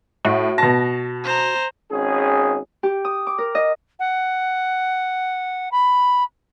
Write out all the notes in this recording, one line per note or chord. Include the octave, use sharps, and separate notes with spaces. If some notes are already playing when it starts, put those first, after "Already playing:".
A2 F#4
B2 A5 A#6
C5 A#5
G#1 C#4 G#4
G4
D#6
D6
A#4
D#5
F#5
B5